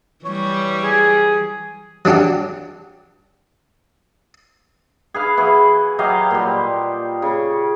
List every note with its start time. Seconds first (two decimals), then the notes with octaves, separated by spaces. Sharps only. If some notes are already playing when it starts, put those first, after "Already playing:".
0.25 E3 G3 C#5
0.83 G#4
2.05 F#3 G3 D4 F#4 G4
5.14 G#4 B4 F5
5.37 E3 F#4 G#4
5.99 F#3 G4 D#5 F5
6.31 A#2 G3
7.22 C#3